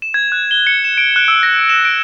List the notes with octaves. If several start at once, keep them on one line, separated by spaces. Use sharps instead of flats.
E7
G#6
F#6
G7
C#7
E7
D7
F#6
E6
A#6
E7
D7